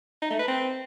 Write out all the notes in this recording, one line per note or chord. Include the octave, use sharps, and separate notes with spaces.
D#4
A3
B4
C4